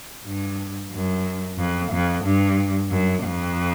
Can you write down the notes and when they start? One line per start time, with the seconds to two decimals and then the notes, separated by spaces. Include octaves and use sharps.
0.25 G2
0.92 F#2
1.58 F2
1.92 F2
2.24 G2
2.90 F#2
3.24 F2